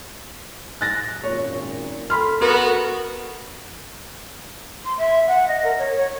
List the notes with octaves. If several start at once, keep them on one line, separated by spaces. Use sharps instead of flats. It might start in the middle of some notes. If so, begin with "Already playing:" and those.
F#6 A6 A#6
G#1 F#2 A#2 C#5
A4 B5 C6 F6
B3 F#4 A#4
C6
E5
F#5
D#5
A#4
C#5
C#5